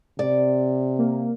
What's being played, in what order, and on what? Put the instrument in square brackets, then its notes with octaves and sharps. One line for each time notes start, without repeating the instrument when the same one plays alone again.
[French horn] C3 [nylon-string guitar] D5
[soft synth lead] A#3